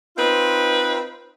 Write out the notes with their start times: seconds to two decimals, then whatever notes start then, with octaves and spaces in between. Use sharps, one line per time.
0.16 C4 D#4 F4 B4